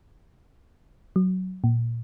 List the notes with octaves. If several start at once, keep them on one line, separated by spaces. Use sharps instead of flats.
F#3
A#2